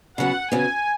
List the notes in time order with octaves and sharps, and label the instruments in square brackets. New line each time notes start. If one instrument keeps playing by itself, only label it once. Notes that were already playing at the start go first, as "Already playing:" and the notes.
[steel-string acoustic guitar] C#3 F#3 B3 [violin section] F#5
[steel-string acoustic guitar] C#3 F#3 B3 [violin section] G#5